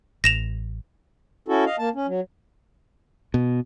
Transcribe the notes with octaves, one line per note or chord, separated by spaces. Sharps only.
A1 A#6 E7 F7
C#4 E4 F#4 A4
D#5 F5
A#3 A5
C#4
F#3
B2